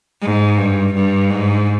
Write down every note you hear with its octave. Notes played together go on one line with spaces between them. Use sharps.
G#2
G2
G2
G#2